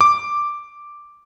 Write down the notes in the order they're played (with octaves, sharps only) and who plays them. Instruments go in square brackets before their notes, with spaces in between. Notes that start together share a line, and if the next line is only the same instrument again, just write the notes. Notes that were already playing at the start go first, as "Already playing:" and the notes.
[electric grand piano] D6